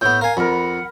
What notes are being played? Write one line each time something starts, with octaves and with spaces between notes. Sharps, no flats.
A2 B3 G6
A#4 F5 G#5
F2 A#4 F#5 B5